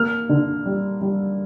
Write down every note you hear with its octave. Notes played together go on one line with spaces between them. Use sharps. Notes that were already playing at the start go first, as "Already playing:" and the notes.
Already playing: A#3 F6
D3
G3
G3